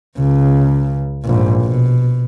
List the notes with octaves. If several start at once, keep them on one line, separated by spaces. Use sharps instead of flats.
C#2 C#3
A#1 G#2
B2